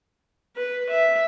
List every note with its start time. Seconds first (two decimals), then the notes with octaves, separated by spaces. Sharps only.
0.56 B4
0.89 E5